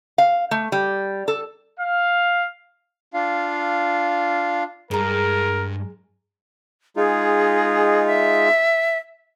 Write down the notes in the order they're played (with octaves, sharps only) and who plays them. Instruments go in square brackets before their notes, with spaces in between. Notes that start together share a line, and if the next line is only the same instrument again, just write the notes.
[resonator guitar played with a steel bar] F5
A3
G3
A4
[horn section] F5
[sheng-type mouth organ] D4 F4 F5
[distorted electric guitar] G2 [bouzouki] G#3 A#5 [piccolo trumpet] A#4
[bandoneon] G#3 D#4 F4 [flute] G#4
[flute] E5